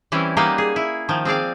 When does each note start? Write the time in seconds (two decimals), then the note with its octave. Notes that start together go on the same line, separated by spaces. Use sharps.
0.12 E3 G3 C4 C#4 E4
0.37 G3 A#3 D#4 B4 F5 F#5
0.58 G#4
0.76 E4
1.09 D#3 F3
1.25 C4 G#4 D5 F5